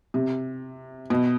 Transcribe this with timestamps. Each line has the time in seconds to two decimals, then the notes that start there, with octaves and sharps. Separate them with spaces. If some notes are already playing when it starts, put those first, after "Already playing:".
0.14 C3
1.10 B2